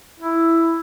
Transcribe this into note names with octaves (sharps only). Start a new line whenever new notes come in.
E4